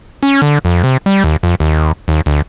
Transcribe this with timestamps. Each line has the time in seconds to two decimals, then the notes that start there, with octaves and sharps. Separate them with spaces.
0.23 C#4
0.42 D3
0.65 F2
0.84 C3
1.06 G3
1.24 D#2
1.43 F2
1.60 D#2
2.08 D#2
2.26 D2